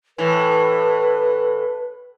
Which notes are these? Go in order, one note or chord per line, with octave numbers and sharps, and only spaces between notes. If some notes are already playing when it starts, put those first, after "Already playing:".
A2 E3 B4